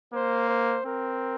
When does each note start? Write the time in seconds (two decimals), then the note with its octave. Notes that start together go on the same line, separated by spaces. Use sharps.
0.13 A#3 C5
0.49 C5
0.86 C4 A#4